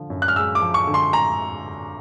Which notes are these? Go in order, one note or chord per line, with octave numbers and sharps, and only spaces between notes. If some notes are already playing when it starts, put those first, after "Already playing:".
Already playing: D3 F3
F#2
F#6
F6
G#3 E6
D6
F3
C#6
D3
C6
A#5